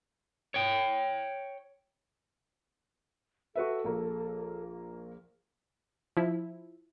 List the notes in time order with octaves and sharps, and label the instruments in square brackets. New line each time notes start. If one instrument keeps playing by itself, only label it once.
[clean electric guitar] C#5 G5
[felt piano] F#4 B4 E5 [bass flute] A4
[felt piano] A#1 A#3
[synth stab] F3 E4